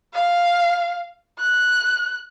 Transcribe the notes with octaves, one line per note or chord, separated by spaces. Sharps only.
F5
F#6